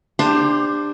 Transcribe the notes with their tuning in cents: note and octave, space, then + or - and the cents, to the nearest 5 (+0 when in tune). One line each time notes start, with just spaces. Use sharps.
D4 +15 G4 +30 C5 -5